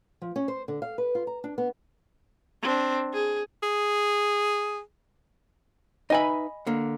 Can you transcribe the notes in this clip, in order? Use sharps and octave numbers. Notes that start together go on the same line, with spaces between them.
F3
C#4
C5
D3
F5
B4
F4
A#5
D4
B3
C4 D4
G#4
G#4
D#4 B4 D#5 E5 G#5 B5
D3 A#3